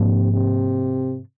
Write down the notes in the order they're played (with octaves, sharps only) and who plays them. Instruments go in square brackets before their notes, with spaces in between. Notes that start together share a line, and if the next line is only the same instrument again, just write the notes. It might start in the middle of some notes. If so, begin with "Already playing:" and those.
Already playing: [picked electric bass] G#2 F3 A#3 D4 [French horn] C3
[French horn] C3